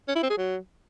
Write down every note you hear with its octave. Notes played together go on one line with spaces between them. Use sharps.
C#4
E4
C4
G#4
F#3